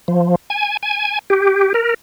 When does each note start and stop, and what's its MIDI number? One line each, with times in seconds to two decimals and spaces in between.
0.08 0.35 53
0.50 0.77 80
0.83 1.19 80
1.30 1.73 67
1.74 1.94 70